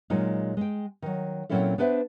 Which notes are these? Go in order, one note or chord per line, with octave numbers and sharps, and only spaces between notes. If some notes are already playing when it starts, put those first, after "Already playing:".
A#2 F#3 G#3 D#4 F4
G#3 G5
D#3 F#3
A#2 F#3 C4 C#4 E4 A4
B3 D4 B4 C5 E5